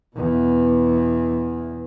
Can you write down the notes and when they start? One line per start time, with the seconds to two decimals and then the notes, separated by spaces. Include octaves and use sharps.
0.16 E2 B2